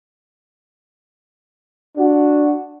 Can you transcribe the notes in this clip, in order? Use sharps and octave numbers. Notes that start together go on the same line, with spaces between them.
D4 F#4